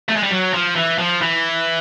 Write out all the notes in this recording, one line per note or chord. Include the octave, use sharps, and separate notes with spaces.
A3
G#3
G3
F#3
F3
E3
F3
E3